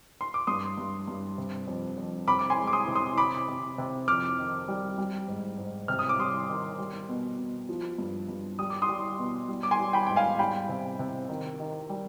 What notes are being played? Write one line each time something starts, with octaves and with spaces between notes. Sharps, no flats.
C6
D6
G2 C6 D#6
G2
G2
C3
F2
F2
C3 B5 D6
D6
G#5 C6
G#3
D6
C6 D#6
C3
C6 D#6
C3 B5 D6
C3
C3
F2 D6 F6
D#3
G3
G3
G#2
G#2
C3 F6
D#6
D6
G3 C6 D#6
D#3
G3
B2
B2
F3
G2
G2
G3 D#6
D6
C6 D#6
G3
B2
G3
D6
G#5 C6
G3
G5 B5
G#2 G5
F5 G#5
G3 G5 B5
C3
C3
D#3
D#3
G3